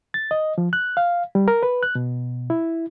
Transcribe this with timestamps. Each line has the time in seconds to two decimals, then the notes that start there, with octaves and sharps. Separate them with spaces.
0.14 A6
0.31 D#5
0.58 F3
0.73 F#6
0.97 F5
1.35 G3
1.48 A#4
1.63 B4
1.83 F#6
1.95 B2
2.50 E4